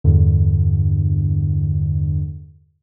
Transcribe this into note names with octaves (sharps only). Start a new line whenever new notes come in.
E2 G2 D3